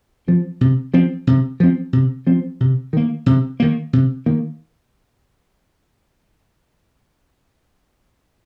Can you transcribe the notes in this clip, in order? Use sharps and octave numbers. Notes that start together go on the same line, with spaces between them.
F3 C4
C3
F3 C4
C3
F3 C4
C3
F3 C4
C3
D#3 A#3
C3
D#3 A#3
C3
D#3 A#3